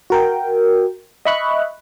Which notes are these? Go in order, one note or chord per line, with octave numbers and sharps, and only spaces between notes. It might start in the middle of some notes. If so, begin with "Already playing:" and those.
F#4 A#4 G5
D#5 E5 B5 C#6 F#6